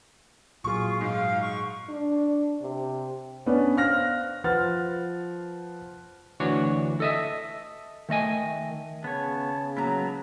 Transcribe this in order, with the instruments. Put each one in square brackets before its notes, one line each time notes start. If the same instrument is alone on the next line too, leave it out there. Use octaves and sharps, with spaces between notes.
[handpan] A#2 F#3 G#4 [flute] F4 [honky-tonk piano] C#6
[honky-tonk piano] G#2 [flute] F5
[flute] C#6
[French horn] D4
C3
[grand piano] B3 C#4 D4 B4 D5
C5 F5 F6 F#6 A#6
F3 B4 C5 F#5 F6 A6
[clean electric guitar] D2 E3 D4 F#4 C#5
A4 D#5 E5
D#3 A3 D#5 G#5
[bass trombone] C#3 [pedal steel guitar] B3 C#5 [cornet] A5
[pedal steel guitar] F#3 B3 E4 [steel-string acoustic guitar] A#3 A#5